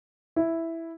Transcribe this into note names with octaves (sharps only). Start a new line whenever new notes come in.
E4